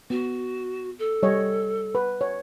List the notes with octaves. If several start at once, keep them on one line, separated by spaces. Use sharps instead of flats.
B3 F#4
A4
G3 C#5 D#5
B4
C#5